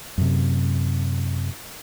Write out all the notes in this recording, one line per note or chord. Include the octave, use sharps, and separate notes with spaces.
F#2 C3